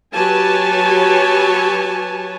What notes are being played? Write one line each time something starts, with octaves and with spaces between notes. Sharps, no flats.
F#3 G4 B4 C#5 G#5 A5